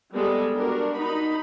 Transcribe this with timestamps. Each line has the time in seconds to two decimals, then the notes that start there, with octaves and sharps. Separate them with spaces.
0.14 G3 G#3 B3 A4
0.55 D4 F#4 A#4
0.97 D#4 B5